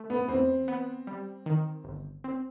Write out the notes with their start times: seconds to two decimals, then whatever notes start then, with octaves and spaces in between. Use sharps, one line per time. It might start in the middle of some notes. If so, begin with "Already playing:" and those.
Already playing: A3
0.10 B3
0.28 E2 C4
0.68 B3
1.07 G3
1.46 D#3
1.84 G1
2.24 C4